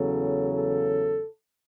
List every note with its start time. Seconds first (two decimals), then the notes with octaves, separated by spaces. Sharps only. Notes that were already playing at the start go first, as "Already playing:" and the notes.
Already playing: E2 C#3 F#3 A4
0.52 A4